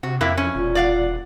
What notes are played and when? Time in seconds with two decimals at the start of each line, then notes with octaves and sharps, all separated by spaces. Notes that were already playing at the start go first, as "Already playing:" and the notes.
0.03 C3 F#4
0.21 F2 C3 A#3 E4
0.37 C#4
0.55 E1 A#2
0.75 D5 F5 F#5